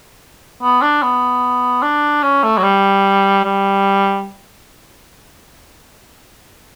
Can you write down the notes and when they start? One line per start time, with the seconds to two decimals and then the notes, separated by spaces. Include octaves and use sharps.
0.62 B3
0.82 D4
1.03 B3
1.83 D4
2.23 C#4
2.43 A3
2.58 F#3
2.63 G3
3.44 G3